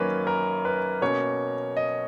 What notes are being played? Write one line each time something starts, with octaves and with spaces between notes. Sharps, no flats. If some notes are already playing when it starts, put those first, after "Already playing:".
Already playing: F#2 D#3 A#3 C#4 B4
A#4
B4
B2 A#3 C#4 C#5
D#5